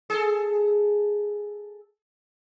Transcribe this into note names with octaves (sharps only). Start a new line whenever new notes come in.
G#4 A4